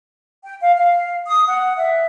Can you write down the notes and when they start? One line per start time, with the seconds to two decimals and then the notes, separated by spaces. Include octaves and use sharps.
0.44 G5
0.60 F5
0.77 F5
1.27 D#6
1.46 F#5
1.76 E5